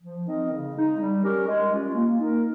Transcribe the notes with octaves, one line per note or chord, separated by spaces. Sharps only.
F3
C4 D#4 A#4 D#5
C#3
G#3 D#4
G3
C#4 G4 A#4
G#3
C#4 F4
A#3
D#4 A#4